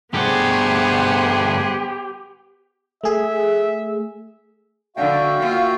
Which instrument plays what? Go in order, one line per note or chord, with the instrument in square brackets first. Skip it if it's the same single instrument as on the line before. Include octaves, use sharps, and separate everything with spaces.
[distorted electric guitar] G2 A3 [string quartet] B3 G#4 [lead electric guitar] G4 [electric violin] C5 F#5
[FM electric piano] A3 G#4 [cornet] E5
[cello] D3 [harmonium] F#4 E5 G5 [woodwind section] F5
[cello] A#3 F4